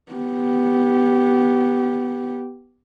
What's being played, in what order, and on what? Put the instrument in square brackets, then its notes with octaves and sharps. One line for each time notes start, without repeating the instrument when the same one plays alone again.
[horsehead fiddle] B3 G4